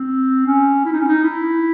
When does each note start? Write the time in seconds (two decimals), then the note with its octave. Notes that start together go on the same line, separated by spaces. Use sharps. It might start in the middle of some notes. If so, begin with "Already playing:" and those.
Already playing: C4
0.46 C#4
0.85 E4
0.92 D#4
1.00 C#4
1.08 D#4
1.24 E4